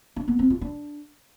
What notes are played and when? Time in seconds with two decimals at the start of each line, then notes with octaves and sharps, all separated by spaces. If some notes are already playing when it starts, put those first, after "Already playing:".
0.16 D4
0.28 B3
0.39 C4
0.50 F4
0.61 D4